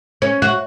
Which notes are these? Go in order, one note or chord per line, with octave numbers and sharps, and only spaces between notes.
C#4
F#4